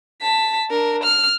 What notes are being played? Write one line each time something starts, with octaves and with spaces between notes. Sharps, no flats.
A5 B6
D4 A#4
F6